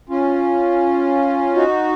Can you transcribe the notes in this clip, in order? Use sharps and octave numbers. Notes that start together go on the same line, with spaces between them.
C#4 F4
D#4 F#4